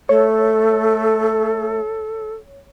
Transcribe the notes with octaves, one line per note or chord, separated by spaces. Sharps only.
A3 A4 C#5